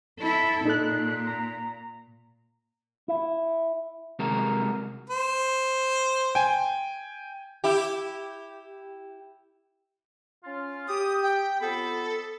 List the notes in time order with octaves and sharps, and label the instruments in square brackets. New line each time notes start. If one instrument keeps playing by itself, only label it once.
[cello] E4 A4
[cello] A#2 [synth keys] D#4 A4 F#6
[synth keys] A#5
[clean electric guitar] E4
C3 G3 G#3 F#4 A4 A#4
[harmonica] C5
[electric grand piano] G5 G#5
[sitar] E4 G4
[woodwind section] C#4 F4
[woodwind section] G4 [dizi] D#6
[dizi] G5
[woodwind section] F2 B3 B5 [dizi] A4